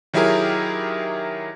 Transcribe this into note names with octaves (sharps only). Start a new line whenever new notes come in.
D#3 F#3 E4 G4 G#4 A#4